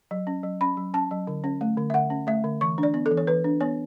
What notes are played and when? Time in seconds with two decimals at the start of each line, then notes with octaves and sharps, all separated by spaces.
0.11 F#3
0.27 C#4
0.43 F#3
0.61 C#4 B5
0.77 F#3
0.94 C#4 A5
1.11 F#3
1.27 D3
1.44 C#4
1.61 A3
1.77 D3
1.90 E5
1.94 D3 F#5
2.10 C#4
2.27 A3 E5
2.44 D3
2.61 E3 C#6
2.78 D4
2.83 D5
2.94 B3
3.06 A4
3.11 E3
3.17 C#5
3.27 E3 B4
3.44 D4
3.61 B3 C#5